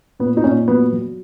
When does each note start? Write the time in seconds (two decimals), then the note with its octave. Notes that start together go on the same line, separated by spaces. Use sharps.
0.20 A#2 B3
0.37 D#4
0.44 A#2 C#4
0.68 F#3 B3
0.93 F#3